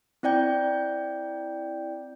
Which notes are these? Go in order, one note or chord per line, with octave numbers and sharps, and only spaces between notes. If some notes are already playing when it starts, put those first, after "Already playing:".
C4 E4 D5 G5 G6